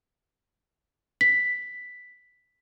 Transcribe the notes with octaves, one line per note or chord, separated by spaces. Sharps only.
B6